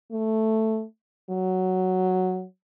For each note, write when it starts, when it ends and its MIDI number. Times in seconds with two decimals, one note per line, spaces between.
0.12 0.84 57
1.30 2.44 54